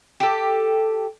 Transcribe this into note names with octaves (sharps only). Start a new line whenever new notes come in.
G4 A4